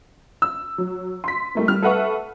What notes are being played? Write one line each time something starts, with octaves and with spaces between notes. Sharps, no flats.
E6
F#3
C6 B6
G3 A3 A#3
G3 F6
A4 B4 E5 F#5 C#6